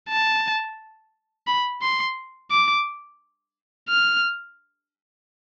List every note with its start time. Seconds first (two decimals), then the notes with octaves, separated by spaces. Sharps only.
0.09 A5
1.47 B5
1.82 C6
2.51 D6
3.89 F6